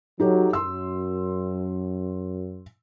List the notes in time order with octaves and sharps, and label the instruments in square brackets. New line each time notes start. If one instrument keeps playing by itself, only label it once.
[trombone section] F#3 [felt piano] D#4 G4 A4
[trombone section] F#2 [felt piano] C6 E6